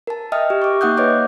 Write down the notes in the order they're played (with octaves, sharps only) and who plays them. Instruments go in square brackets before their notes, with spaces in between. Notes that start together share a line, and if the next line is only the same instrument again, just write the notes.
[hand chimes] A#4 A5
D#5 E5 G5 D#6 F6
G4
C#6 D6
A#3 D#4 F#5 D#6 F#6 G6
B4 C#5 D#5 E5 D6